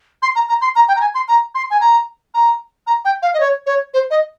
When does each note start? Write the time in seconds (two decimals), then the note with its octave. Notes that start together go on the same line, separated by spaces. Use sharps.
0.22 C6
0.35 A#5
0.49 A#5
0.62 C6
0.76 A#5
0.88 G5
0.96 A#5
1.01 G#5
1.14 C6
1.28 A#5
1.55 C6
1.70 G#5
1.81 A#5
2.34 A#5
2.87 A#5
3.05 G5
3.22 F5
3.34 D#5
3.40 C#5
3.66 C#5
3.94 C5
4.11 D#5